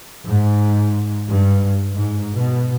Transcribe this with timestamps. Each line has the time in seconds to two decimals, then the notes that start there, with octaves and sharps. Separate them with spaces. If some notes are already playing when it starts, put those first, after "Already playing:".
0.23 G#2
1.27 G2
1.94 G#2
2.34 B2